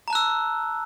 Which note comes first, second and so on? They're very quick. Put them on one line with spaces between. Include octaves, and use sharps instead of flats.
A#5 A5 F#6 E6